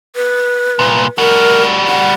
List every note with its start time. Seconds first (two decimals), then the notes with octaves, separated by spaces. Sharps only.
0.16 B4
0.79 C2 A#2
1.18 G3 F#4 A#4
1.88 F#5